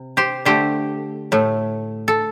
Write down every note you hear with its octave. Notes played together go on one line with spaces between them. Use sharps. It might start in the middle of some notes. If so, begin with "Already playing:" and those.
Already playing: C3
G4 C5
D3 A3 G4 C5
A2 A3
A4